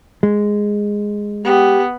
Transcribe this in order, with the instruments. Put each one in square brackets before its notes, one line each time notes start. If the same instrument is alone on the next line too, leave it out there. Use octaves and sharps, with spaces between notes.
[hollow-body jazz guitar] G#3
[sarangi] B3 [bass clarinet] G4